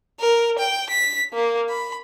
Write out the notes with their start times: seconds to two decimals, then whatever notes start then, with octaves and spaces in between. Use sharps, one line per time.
0.20 A#4
0.59 G5
0.90 B6
1.33 A#3
1.69 B5